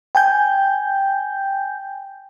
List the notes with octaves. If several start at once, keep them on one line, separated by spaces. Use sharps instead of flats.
G5 G#5 G6